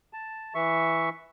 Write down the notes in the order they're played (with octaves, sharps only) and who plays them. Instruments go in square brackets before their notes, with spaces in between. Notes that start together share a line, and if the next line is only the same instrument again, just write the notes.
[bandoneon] A5
E3 E5 C#6